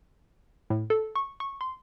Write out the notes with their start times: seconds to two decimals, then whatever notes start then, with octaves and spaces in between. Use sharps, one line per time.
0.70 A2
0.90 A4
1.16 C#6
1.40 C#6
1.61 C6